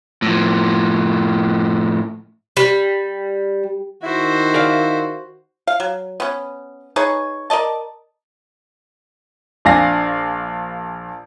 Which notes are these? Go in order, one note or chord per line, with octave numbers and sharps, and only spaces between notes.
A2 F3
G3
D#3 E4 F#4 C5
G#4 D5 F5
F5
F#3
B3 C#4
D#4 G#4 B4 C#5
A#4 D5 D#5 A5
A#1 D4 F5 G#5 A#6